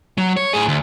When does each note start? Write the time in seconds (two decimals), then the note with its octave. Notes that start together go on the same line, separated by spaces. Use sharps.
0.18 F#3
0.37 C#5
0.53 A2 G#4
0.68 D2